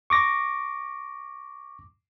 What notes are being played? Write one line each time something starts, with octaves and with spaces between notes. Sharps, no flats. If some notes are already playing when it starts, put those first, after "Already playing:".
C#6 D6 A#6